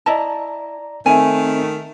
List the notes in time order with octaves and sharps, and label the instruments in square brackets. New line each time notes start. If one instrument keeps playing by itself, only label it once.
[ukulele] E4 D#5 A5 [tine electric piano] D5 A#5
[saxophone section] D#3 A3 [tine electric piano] C4 E5 [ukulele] G#5